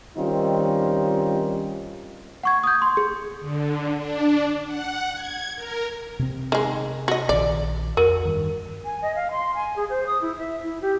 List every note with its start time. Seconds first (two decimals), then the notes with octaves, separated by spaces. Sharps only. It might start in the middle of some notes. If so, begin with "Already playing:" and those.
0.17 D#3 G3 C4 C#4 D#4 F4
2.44 F#5 C#6 G#6
2.64 D#6 G6
2.82 C6
2.97 G#4
3.40 D3
3.96 D4
4.65 F#5
5.13 G#6
5.56 A#4
6.19 C3 C4
6.52 D#3 G#3
7.08 F#4 D#5
7.29 A#1 D#3 D5
7.97 F2 F#4 A#4
8.25 G2 D#3
8.85 G#5
9.02 D#5
9.15 F5
9.31 C6
9.55 G#5
9.76 G#4
9.89 C5
10.07 D#6
10.22 E4
10.39 E5
10.63 E4
10.82 G4